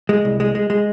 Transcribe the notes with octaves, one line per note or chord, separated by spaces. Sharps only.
G#3
C2
G#3
G#3
G#3